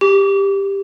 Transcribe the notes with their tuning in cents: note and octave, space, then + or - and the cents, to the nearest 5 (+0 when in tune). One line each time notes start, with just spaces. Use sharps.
G4 +10 D6 -40